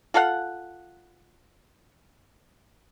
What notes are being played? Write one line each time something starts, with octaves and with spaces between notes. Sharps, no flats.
F4 A4 F5 F#5